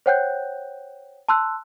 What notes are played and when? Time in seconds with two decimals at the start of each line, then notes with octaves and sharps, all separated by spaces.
0.06 C5 C#5 F#5 G5 F#6 G6
1.28 A5 C6 E6 F#6